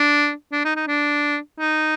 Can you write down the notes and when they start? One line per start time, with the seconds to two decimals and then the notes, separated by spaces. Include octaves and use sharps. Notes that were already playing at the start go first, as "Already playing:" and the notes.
Already playing: D4
0.52 D4
0.65 D#4
0.76 D#4
0.88 D4
1.59 D#4